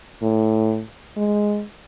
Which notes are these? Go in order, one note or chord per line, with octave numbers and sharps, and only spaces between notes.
A2
G#3